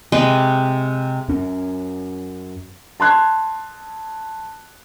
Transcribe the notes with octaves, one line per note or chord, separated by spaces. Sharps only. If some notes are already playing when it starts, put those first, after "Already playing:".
C3 G#3 B4 G5
F#2 C#4
A5 C6 F#6 G#6